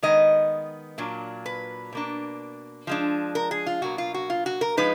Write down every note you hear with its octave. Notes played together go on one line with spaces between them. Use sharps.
D#3 G#3 B3 D#5
A#2 F#3 A#3 D4
B4
B2 A#3 D4
F3 G#3 D4
A#4
G#4
F4
B2 F#3 A#3 F#4
F4
F#4
F4
F#4
A#4
F3 G#3 D#4 B4